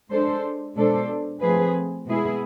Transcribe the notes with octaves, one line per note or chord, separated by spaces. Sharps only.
G#3 D4 A4 C5
B2 G#3 D4 A4 C5
F3 A3 C4 G#4 B4
B2 G#3 B3 E4 G#4